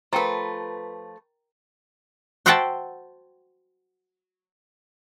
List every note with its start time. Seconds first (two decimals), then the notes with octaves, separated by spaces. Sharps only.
0.13 F3 A3 A#4 B4 G5 A#5
2.46 F#4 C5 E5 F#5 G5 A5